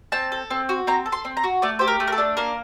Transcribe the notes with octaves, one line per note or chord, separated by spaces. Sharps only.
C4 A5
A4
C4
F#4
C4 A#5
A4
C6
C4
A#5
F#4
A3 D5
G4 C5
A#4
A3
A#4
A4
D4
A#3 A#4